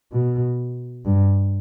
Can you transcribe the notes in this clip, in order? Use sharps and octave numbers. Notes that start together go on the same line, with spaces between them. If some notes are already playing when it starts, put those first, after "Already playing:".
B2
G2